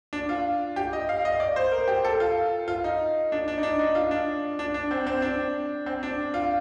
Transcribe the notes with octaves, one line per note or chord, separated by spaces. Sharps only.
D4
F4
G4
D#5
F5
D#5
D5
C5
A#4
G4
A4
F4
F4
D#4
D4
D4
D#4
D4
D#4
F4
D4
D4
D4
C4
C4
D4
C4
D4
F4